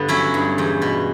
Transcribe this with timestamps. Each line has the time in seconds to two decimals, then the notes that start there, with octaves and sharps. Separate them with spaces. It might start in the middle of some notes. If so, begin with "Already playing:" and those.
Already playing: G2 D3 B3
0.08 F#3 C#4 E4
0.34 G2
0.58 E2
0.82 B2